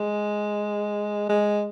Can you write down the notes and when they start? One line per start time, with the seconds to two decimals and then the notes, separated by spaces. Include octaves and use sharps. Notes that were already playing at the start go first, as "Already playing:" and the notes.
Already playing: G#3
1.29 G#3